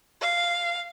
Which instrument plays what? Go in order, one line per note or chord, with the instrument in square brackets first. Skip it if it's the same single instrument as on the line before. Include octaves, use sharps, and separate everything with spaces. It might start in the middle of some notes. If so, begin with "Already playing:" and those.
[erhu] F5